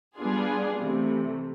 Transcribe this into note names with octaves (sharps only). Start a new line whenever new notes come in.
G3 B3 D4 F4 G#4
C3 E3 A3